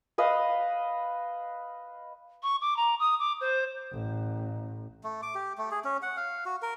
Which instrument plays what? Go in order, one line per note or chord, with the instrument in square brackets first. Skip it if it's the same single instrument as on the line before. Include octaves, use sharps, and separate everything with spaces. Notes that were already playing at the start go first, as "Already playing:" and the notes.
[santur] B4 D#5 F5
[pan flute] C#6
D6
A#5
D#6
D6
C5
[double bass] A1
[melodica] A3
D6
G4
A3
G#4
C#4
F#5
F5
F#4
A#4